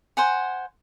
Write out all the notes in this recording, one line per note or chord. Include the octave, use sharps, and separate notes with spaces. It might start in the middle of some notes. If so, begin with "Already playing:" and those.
C5 F#5 G#5